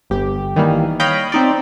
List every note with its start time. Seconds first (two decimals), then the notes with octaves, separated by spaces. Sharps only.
0.10 G1 G4
0.56 D#3 E3 G3 A#3
1.00 C#5 D#5 F5 G5 B5
1.32 C4 D#4 D5